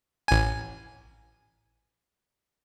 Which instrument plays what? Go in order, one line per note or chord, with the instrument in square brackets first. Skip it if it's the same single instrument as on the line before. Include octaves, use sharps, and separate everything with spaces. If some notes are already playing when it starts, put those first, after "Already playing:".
[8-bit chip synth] A1 G#5